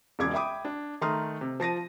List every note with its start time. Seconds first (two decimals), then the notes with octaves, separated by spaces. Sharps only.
0.19 E1 C#2 D6 G#6
0.33 E5 G5 B5 D6 D#6
0.65 D4
1.01 D#3 A3 A#5 C6 D#6 F6
1.41 C3
1.60 F3 A5 A#6 D#7